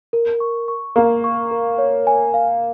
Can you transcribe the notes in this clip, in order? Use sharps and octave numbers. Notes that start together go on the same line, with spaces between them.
A#4
C#6
C#6
A#3 A#5
C#6
A#4
C#5
G#5
F5